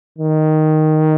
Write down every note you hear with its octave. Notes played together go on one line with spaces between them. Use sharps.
D#3